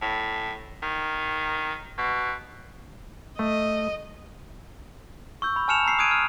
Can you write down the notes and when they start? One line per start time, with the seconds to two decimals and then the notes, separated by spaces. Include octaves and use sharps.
0.02 A2
0.83 D#3
1.98 B2
3.39 A3 D#5
5.42 C#6 E6 G6
5.56 B5
5.68 G#5 A5 F6 C#7 E7 F7
5.85 A#5 E6 C7
5.99 D#6 F#6 G#6 D7 D#7
6.11 F6